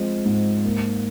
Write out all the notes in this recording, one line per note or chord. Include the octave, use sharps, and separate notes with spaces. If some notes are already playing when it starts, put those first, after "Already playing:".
Already playing: F3 G#3 C4
G#2
A#3